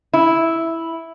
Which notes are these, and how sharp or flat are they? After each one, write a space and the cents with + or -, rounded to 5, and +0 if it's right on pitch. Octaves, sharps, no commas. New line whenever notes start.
E4 -5